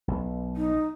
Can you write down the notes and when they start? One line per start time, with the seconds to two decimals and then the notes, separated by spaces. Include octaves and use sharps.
0.08 B1
0.56 D#4